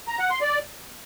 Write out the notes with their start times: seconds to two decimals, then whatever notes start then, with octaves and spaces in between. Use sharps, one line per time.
0.08 A#5
0.19 F#5
0.30 C6
0.42 D5